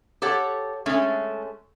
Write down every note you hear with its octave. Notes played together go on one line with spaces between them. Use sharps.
G4 A4 C#5 F#5
G#3 A3 C#4